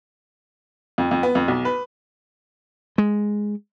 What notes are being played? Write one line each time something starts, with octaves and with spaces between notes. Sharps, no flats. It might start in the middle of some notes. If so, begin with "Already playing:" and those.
F2
F2
B3
F2
B1
B4
G#3